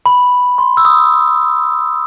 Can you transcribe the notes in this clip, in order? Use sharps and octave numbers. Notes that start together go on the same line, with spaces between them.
B5
C6
E6
D#6